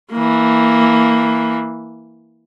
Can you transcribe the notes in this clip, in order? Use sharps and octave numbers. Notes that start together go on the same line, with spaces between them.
E3 A#3